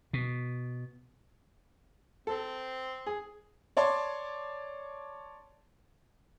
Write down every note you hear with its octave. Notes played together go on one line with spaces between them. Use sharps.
B2
C4 A4
G#4
C#5 D5 A5 C6